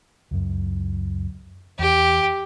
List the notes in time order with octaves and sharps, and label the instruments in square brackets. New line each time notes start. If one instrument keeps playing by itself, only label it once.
[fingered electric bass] C#2 F#2
[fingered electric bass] E2 [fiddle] G4